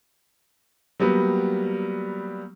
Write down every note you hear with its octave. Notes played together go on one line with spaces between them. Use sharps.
F#3 G3 A#3 B3